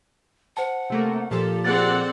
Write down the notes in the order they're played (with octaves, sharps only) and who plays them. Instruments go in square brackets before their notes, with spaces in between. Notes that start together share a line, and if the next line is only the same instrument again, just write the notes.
[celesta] C5 A5 [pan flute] F#5
[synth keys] C3 A3 A#3
[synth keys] A#2 F3 A4 [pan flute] G4
[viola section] C4 D5 F#5 [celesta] G#4 A6